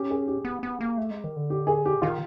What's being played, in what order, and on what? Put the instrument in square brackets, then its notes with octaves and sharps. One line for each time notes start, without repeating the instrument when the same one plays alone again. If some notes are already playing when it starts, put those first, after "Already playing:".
Already playing: [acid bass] C#4 [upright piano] G4
[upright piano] G#4
G4
[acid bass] B3
B3
A#3
A3
G#3
D#3
D3
[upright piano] G4
G#4
G4
[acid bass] D#3 [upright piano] F4